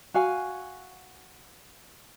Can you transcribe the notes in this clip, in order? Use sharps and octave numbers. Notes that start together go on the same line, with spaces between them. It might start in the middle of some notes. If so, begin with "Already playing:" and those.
F#4 F5 G#5